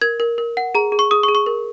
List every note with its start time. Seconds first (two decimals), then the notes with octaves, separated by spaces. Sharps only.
0.02 A#4 G#6
0.20 A#4
0.38 A#4
0.57 F#5
0.75 G#4 A#5
0.92 G#4
0.99 C#6
1.11 G#4 D#6
1.23 C#6
1.28 G#4
1.35 C#6
1.46 A#4